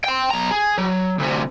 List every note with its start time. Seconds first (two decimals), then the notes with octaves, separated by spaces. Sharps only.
0.04 G5 C6
0.31 B1 A#5
0.51 G#4
0.78 F#3
1.19 D2 C3